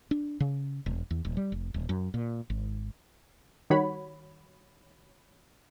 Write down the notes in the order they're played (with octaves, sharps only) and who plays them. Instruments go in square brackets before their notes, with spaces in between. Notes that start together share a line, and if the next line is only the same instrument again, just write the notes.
[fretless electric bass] D4
C#3
E1
E2
D#1
G3
F1
D#1
F#2
A#2
G#1
[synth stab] D#3 G3 F#4 C#5 B5